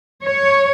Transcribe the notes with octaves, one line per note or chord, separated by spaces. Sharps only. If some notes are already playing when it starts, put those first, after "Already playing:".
C#5